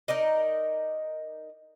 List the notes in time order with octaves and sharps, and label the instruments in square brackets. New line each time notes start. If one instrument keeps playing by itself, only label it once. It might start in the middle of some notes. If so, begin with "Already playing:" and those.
[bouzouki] D#4 A#4 D5 D#5